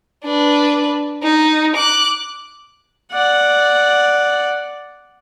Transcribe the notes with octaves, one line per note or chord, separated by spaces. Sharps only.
D4 B4
D#4
D6 F#6
D5 F#5